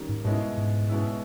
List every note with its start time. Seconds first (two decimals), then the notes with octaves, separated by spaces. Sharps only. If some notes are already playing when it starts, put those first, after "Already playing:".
Already playing: D#3 G3 C#4
0.09 G#2
0.24 G#2 B2 G#3 C#4 E4
0.57 G#2
0.89 B2 G#3 C#4 E4